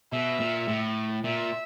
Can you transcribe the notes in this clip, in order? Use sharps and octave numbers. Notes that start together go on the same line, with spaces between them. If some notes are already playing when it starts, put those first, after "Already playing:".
B2 E5
A#2
A2
A#2 E5